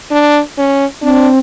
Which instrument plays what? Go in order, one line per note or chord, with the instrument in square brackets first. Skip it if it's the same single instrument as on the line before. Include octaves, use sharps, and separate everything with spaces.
[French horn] D4
C#4
[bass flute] C4 [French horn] D4